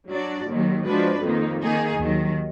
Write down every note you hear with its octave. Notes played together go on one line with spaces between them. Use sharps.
F#3 D4 F#4 D5
D#2 D#3 F#3
F3 G#3 D4 F#4 B4
F2 D#3 A#3 D#4
D#3 A#3 D#4 G#4
D#2 D#3 F#3